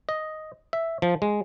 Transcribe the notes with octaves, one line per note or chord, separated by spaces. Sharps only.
D#5
E5
F3
G#3